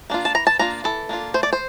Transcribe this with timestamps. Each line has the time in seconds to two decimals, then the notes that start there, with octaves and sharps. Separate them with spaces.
0.10 A#3 D4 F4
0.25 A5
0.35 E3 A#5
0.47 A5
0.59 A#3 D4 F4 A#5
0.84 E3 A4
1.09 A#3 D4 F4
1.34 A3 C5
1.43 D5
1.53 C5